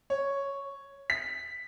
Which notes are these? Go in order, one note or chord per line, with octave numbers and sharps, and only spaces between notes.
C#5
B6